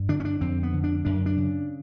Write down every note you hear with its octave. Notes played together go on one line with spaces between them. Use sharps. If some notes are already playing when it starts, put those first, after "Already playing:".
Already playing: G2
D3 D4
C#4
D4
F2 C4
B3
D3
D4
F#2 D4
D4
C#3